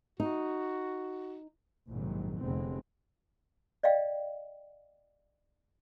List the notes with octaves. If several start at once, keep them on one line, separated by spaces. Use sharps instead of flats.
D#4 F#4
A#1 F2 G#2 C3 D#3 F#3
F1 D3 G#3 B3 C4
D5 D#5 F5 G5